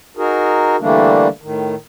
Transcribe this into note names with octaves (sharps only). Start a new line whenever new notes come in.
D#4 F#4 G#4 A#4
D3 E3 G3 A3 A#3 D4
A2 D#3